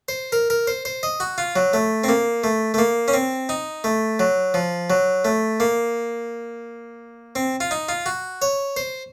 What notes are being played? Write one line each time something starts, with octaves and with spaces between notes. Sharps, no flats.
C5
A#4
A#4
C5
C5
D#5
F#4
F4
F#3
A3
C4
A#3
A3
A3
A#3
C#4
C4
D#4
A3
F#3
F3
F#3
A3
A#3
C4
F4
D#4
F4
F#4
C#5
C5